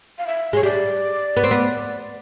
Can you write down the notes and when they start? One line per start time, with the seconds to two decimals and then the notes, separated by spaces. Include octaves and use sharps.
0.18 F5
0.27 E5
0.53 G#3 C#5
0.63 G3 D5
1.37 B3
1.44 C4
1.51 B3